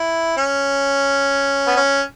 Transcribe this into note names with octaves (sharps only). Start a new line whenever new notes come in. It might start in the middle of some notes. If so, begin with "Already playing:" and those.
Already playing: E4
C#4
B3
C#4